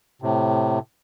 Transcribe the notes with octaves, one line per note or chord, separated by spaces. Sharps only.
A2 C3